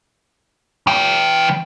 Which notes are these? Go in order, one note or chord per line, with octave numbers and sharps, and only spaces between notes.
E3 G5